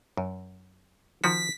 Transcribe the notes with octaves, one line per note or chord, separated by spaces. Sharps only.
F#2
D#3 F3 F#4 B6